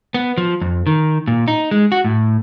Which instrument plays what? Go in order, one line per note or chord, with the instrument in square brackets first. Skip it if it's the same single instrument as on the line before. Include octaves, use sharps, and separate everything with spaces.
[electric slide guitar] B3
F3
F2
D#3
A#2
D#4
G#3
F#4
A2